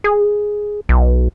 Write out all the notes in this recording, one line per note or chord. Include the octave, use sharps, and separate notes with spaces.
G#4
B1